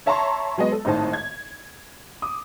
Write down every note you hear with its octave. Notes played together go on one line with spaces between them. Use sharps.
C#5 E5 A5 A#5 C6 C#6
F#3 G#3 B3 D#5
A4
G#1 A2 D#4 C5 D#5 A5
G#6
D6 D#6